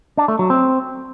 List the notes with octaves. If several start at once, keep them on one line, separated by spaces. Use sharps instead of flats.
D4
A3
F#3
C4